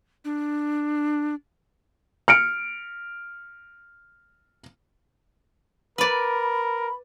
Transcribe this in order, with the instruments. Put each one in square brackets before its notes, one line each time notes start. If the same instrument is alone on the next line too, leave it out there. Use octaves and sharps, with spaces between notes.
[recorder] D4
[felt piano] F6 C#7 D7
[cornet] A#4 [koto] B4 D5 [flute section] B5